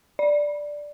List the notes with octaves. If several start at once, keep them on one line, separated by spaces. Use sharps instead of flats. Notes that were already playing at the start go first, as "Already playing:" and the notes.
D5